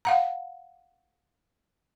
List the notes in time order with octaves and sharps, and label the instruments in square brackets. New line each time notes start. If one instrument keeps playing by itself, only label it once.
[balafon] F5 F#5 A#5